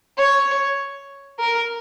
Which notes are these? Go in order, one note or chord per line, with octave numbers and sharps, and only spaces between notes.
C#5
A#4